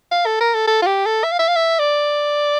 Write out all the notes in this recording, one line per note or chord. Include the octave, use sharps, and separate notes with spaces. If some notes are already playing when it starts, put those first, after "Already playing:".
F5
A4
A#4
A4
A4
F4
G4
A4
E5
F5
E5
F5
E5
D5